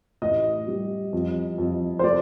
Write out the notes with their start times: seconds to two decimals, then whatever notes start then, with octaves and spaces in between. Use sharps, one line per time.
0.22 A1 D#5
0.67 G3
1.13 F2
1.58 F2
1.99 C5
2.04 A3 D5